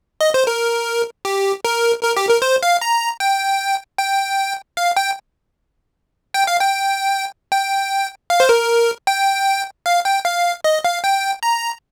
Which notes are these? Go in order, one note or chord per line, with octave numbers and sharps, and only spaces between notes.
D#5
C5
A#4
G4
A#4
A#4
G4
A#4
C5
F5
A#5
G5
G5
F5
G5
G5
F5
G5
G5
F5
C5
A#4
G5
F5
G5
F5
D#5
F5
G5
A#5